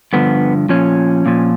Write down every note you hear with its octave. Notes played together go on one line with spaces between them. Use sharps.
G2 D3 F3 B3
A#2 F3 C#4
A#2 F3